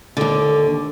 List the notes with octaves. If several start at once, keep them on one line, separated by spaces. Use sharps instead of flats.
D#2 D3